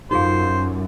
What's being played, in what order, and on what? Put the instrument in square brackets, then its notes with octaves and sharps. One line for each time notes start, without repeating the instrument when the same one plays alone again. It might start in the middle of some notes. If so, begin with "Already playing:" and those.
[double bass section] F#2 [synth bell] D#4 F4 F5 [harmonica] C5